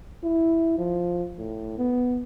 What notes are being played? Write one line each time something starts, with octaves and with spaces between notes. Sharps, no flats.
E4
F3
A2
B3